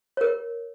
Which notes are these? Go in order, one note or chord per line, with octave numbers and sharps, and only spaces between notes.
A#4 C#5